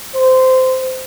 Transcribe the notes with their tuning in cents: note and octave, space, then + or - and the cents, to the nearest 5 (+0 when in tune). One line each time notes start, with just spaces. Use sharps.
C5 -15